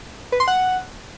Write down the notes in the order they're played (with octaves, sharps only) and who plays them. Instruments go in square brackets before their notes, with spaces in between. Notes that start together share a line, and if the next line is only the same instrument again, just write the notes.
[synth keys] B4
C6
F#5